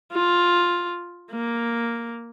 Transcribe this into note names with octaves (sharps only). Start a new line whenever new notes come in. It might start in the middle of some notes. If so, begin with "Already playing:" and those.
F4
A#3